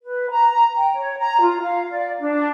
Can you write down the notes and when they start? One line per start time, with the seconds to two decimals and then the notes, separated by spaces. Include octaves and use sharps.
0.03 B4
0.31 A#5
0.77 G5
0.94 C#5
1.18 A#5
1.42 F4
1.63 F5
1.91 D5
2.19 D4